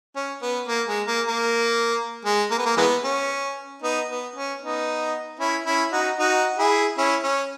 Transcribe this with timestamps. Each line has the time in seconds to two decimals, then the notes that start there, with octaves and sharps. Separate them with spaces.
0.16 C#4
0.42 B3
0.68 A#3
0.88 G#3
1.07 A#3
1.28 A#3
2.25 G#3
2.51 A#3
2.58 B3
2.66 A#3
2.77 E3 G#3 B3
3.04 C#4
3.82 B3 D#4
4.09 B3
4.36 C#4
4.62 B3 D#4
5.39 C#4 E4
5.66 C#4 E4
5.92 D#4 F#4
6.19 D#4 F#4
6.58 E4 G#4
6.97 C#4 E4
7.24 C#4